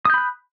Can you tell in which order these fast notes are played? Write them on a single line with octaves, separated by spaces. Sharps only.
D#6 G6 B5 F#6